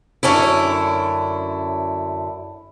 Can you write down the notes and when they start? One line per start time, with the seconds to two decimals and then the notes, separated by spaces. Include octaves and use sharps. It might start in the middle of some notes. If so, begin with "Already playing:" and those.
0.23 F#2 A#2 D3 C#4 D4 E4